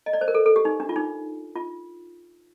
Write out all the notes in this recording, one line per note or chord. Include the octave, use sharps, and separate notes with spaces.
D#5
D5
C5
A#4
A4
A4
G4
D#4
D4
F4
D#4
F4